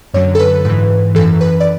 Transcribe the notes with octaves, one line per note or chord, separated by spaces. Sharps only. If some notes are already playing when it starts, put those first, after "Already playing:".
F#2 D3 F#3 C#5
A4
B4
G#2 E3 B4
F#2 E3 A4
B4
D5